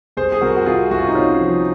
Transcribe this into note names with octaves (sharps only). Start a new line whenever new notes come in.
C2 G#4 C5
G#4
C2 F#4 A#4
F#4
C3 F4 G#4
C2 F#4
F4
D#4
C3 C#4 F4
F3